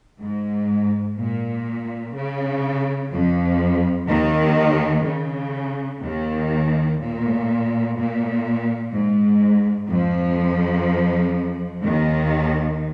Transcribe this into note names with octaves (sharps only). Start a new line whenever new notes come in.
G#2
A#2
C#3
F2 F3
D#2 D#3
C#3
D#2 D#3
A#2
A#2
G#2
F2 F3
D#2 D#3